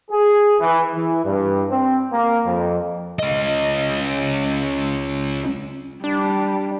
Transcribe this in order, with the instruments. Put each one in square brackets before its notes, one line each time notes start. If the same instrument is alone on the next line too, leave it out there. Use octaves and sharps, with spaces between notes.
[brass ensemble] G#4
E3
E3
G2
C4
A#3
F2
[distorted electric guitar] C#2 D#5
[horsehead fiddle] G3 [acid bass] D4